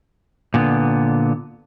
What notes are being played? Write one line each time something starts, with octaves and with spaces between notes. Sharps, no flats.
A#2 D3 B3